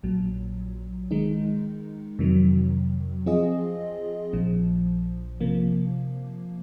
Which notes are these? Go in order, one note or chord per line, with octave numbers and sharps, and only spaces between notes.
A#1 A#2 F#3
D#3 G#3 D#4
F2 C3 D#3 F#3
F3 C4 F4 G#4 D#5
A#1 A#2 F3
C3 F3 A#3